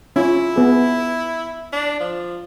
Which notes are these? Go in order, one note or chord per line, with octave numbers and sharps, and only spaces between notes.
C#4 E4 F4
B3 G#4
D4
F3